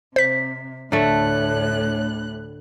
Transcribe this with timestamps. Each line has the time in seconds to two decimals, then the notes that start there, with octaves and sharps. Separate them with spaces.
0.16 C3 C5 B6
0.92 D2 A2 D3 A3 C#5 F#6